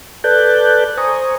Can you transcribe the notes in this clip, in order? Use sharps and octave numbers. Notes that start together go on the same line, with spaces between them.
A4 B4 D5 A5 F#6 G6
C5 G#5 A#5 C#6 D#6